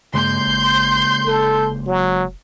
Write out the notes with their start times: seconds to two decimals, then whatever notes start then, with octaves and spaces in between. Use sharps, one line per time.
0.14 G2 C#3 G#3 A#3 C6 G6
0.47 G#1
1.26 F1 A4
1.87 F#3